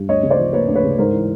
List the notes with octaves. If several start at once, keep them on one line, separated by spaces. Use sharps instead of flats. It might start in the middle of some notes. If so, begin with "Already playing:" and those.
Already playing: G2
D2 C#5 D#5
C#3
C5 D5
F3
A#3 B4 C#5
D2
B4 C#5
C#3
G#2 A#4 C5
E3